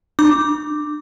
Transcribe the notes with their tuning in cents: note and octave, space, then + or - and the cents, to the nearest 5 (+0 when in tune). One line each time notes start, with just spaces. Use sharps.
D4 +35 D6 +0